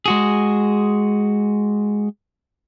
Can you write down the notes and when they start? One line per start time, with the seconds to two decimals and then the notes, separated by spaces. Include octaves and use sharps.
0.06 G#3 F#4 G#4